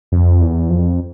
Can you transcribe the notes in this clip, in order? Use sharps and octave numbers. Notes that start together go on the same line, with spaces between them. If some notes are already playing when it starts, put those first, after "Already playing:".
F2
E2
F2